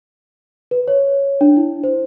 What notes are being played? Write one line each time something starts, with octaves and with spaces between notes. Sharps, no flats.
B4
C#5
D4
E4
C5